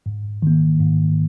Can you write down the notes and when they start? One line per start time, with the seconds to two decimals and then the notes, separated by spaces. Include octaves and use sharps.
0.06 G#2
0.42 D#3 A#3
0.80 G#2